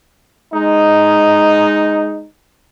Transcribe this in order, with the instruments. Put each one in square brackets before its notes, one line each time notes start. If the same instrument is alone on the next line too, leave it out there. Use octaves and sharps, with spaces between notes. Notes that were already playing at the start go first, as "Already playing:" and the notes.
[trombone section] G#3 D#4